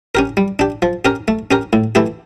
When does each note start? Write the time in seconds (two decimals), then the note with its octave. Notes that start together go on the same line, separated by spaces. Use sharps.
0.15 C#4 G4 A#4
0.37 G3
0.59 D4 G4
0.82 F3
1.05 C#4 G4 A#4
1.28 A3
1.51 C#4 G4 A#4
1.73 A2
1.95 E3 A3 E4 G4